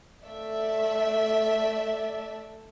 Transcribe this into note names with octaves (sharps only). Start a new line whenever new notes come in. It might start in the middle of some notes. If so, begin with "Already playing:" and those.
A3 D5 E5